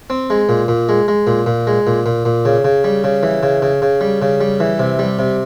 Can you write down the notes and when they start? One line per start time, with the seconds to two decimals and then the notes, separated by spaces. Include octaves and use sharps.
0.10 C4
0.30 G#3
0.49 A#2
0.68 A#2
0.89 G#3
1.08 G#3
1.27 A#2
1.46 A#2
1.67 G#3
1.87 A#2
2.06 A#2
2.25 A#2
2.45 C#3
2.65 C#3
2.84 G3
3.04 C#3
3.23 E3
3.43 C#3
3.62 C#3
3.82 C#3
4.01 G3
4.22 C#3
4.41 G3
4.60 E3
4.79 C3
4.99 G3
5.19 C3